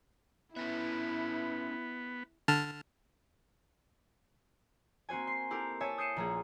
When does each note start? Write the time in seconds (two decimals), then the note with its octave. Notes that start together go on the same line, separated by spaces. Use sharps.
0.56 B3 C#4 E4 B4 E5
2.48 D3 A5 F6
5.09 A#3 C4 F#4 C5 G#5
5.27 C6 C7
5.50 E4 G4 A4 A#4
5.81 C#5 E5 G#5 A5
5.98 D#6 G6 C7 C#7 D#7 E7
6.16 A#1 A#3 G#4